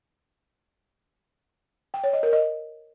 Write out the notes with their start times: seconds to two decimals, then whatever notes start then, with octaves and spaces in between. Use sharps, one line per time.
1.94 G5
2.04 C#5
2.13 D#5
2.23 A#4
2.33 D#5